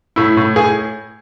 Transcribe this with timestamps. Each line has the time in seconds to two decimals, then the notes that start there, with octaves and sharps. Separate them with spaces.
0.16 A2 E4
0.37 A2
0.56 A2 G#4